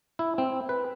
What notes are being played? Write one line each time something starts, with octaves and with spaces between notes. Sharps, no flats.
E4
C4
B4